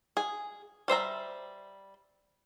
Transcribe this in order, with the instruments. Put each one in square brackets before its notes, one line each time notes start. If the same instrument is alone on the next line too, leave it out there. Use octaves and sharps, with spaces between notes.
[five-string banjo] G#4
G3 C5 E5 A#5